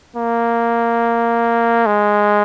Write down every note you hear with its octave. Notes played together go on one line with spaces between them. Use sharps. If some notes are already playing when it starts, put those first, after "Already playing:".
A#3
G#3